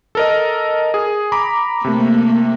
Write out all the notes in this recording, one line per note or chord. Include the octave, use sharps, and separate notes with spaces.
A4 A#4 D#5
G#4
A#5 B5 D6
C3 A3 A#3